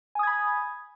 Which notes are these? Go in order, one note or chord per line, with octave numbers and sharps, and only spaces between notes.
G#5 B5 D#6 G#6